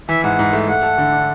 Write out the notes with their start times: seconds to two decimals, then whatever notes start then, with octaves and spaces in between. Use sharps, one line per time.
0.09 E3 E5
0.24 G#2 F#5
0.39 G#2
0.53 A3
0.68 A3 F#5
0.83 A4
0.98 D3
1.12 D4